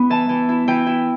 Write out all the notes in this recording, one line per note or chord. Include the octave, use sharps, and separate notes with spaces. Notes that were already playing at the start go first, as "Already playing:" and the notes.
Already playing: B3 E4 B5
E3 A5
E3
E4
E3 G5
E4